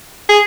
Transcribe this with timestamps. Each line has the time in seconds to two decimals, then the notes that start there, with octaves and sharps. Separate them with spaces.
0.29 G#4